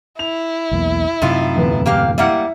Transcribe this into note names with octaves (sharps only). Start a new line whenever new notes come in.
E4 F7
B1 E2 A#3
F#2 A2 C3 D#4 F4
D1 E2 B4
A#3 G4 F5
G3 A#3 E4 E5 F#5